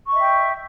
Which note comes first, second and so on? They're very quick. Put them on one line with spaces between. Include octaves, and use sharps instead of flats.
C#6 D#5 E5 G5